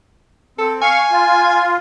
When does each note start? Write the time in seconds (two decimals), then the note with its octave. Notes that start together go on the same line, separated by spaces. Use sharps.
0.58 C4 A4
0.81 F5 G#5 C#6
1.11 F4